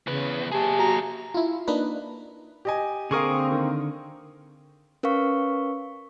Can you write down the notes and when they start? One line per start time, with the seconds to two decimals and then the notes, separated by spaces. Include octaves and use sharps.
0.07 E2 C#3 B4
0.52 A#3 G4 G#4 A5
0.79 F#4 A#5
1.34 E4 F4
1.68 A#3 D4 D#4 B4
2.65 G4 D#5 G#5
3.11 D3 A#3 C4 G#4 A#4 F5 C#6 D#6
3.52 D#3
5.03 C#4 A#4 B4 F5 C#6